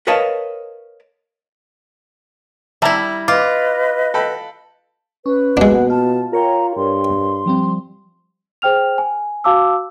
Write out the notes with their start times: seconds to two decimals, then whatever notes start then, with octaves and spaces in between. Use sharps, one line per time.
0.07 A#4 B4 C#5 D#5 F5 A5
2.82 G3 E4 E5 A5 A#5
3.28 F4 B4 D#5 D6
4.14 A4 G5 B5
5.26 C#4 B4
5.57 B2 G#3 A#3 B3 D4 F#5
5.90 F4 A5
6.33 F4 A#4 C#5 G5 A#5
6.77 G2 C6
7.46 F3 G3 C4
8.62 G#4 C5 G5 F6 F7
8.98 G#5
9.44 F#4 F5 A5 D6 E6